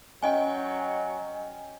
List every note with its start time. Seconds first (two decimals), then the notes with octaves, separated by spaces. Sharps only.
0.22 F#3 C#4 D#5 G5 G#5